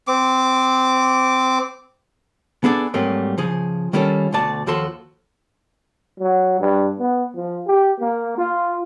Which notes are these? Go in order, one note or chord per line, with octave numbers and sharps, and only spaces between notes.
C4 D6
B3 D4 G#4 A4 D5
G#2 F#3 G3 A3 A#3 C4
C#3 F3 G#4
D#3 G3 A#3 C#4 F4 A4
D2 B2 A3 D5 A5
D#2 F3 F#4 A4 C6
F#3
G2
B3
F3
G4
A#3
F4